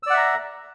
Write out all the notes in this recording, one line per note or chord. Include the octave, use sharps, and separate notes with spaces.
D5 E5 F#5 A#5 E6